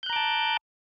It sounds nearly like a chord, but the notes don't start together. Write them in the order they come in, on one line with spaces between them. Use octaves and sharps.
G6 F#6 A#5 D6 A5